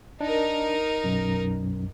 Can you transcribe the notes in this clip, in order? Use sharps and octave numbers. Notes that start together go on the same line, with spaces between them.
D4 D#4 A#4
B1 F#2